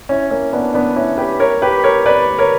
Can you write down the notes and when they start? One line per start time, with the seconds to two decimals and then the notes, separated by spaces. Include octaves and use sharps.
0.09 C#4 E4
0.31 A#3 C#4
0.53 B3 D4
0.74 B3 D4
0.96 C#4 E4
1.18 G4 B4
1.40 A#4 C#5
1.62 G4 B4
1.84 A#4 C#5
2.06 B4 D5
2.39 A#4 C#5